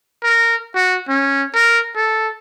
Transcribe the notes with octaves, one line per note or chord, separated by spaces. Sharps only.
A#4
F#4
C#4
A#4
A4